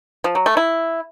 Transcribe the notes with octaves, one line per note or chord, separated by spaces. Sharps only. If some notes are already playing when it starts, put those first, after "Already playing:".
F3
F#3
A3
E4